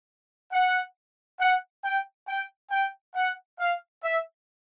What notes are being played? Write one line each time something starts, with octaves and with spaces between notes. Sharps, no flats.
F#5
F#5
G5
G5
G5
F#5
F5
E5